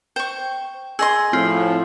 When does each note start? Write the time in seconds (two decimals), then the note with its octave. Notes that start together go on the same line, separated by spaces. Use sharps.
0.16 C5 G5 C#6
0.99 G#4 D#5 C6 E6
1.33 A2 F3 C4 F4